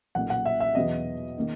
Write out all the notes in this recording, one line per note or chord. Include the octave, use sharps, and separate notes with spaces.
B1 A#2 A#3 F#5
F#5
E5
E5
E2 B2 F#3 B3 D#5
D#3 A#3